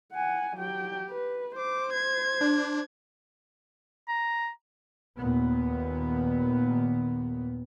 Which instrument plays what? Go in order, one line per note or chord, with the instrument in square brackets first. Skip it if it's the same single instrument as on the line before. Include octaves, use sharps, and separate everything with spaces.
[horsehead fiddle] F#5 G#5
[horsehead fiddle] F#3 G5 [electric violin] G4
[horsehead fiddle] B4
[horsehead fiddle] C5 [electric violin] D6
[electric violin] G#6
[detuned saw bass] D4
[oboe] A#5
[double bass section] D#2 A#2 B3